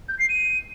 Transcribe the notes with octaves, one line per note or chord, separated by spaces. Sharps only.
G6
C7
D#7